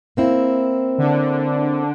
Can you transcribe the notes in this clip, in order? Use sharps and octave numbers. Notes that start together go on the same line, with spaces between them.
A#3 C4 E4
D3 D4